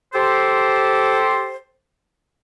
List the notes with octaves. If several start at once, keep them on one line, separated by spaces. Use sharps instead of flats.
G4 A4 C5